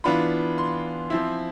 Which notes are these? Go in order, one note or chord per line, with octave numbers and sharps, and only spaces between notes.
E3 B3 D4 F4 B5
C6
F3 C4 E4